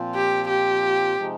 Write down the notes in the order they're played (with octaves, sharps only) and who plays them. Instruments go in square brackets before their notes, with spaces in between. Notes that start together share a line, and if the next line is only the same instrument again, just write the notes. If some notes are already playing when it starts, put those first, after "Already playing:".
Already playing: [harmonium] A#2 F3 C4 F4
[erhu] G4
G4
[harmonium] C3 F3 G#3 D#4